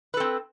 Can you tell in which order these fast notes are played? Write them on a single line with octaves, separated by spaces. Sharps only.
B4 A4 C4